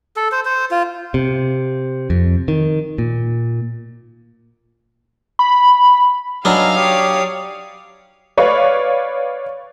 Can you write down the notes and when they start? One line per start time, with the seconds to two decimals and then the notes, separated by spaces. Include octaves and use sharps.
0.17 A4
0.32 C5
0.45 C5
0.71 F4
1.14 C3
2.10 F2
2.48 D#3
2.98 A#2
5.39 B5
6.45 F#3 B3 D4 D#4 F5 G#5 E6 F6
6.76 G4 C#5 D5 D#6
8.37 B4 C#5 D5 F5